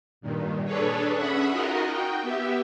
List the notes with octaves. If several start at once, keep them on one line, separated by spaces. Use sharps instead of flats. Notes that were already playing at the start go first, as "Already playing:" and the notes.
G2 A#2 D#3
D4 G#4 A4 B4 C#5
C#4 G#4 E5 F#5 B5
D#4 F4 F#4 A#4 D#5
F#4 G5
B3 G4 E5